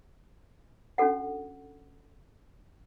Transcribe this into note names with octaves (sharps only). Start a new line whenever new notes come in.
C#4 D4 F#4 A4 F#5